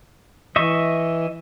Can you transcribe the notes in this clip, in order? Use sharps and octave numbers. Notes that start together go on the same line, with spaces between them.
E3 D#5 E5 C#6